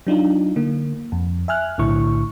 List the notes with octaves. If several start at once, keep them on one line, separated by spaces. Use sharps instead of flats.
F#3 D4 D#4 F4
D3 A#3
F2
E5 G#5 F6 F#6
B1 A2 D3 E4 C#6